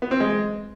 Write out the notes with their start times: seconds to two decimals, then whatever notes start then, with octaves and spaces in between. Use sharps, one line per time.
0.02 B3
0.11 C4
0.20 G#3